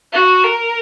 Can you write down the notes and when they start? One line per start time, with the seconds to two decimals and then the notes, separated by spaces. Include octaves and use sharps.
0.13 F#4
0.43 A#4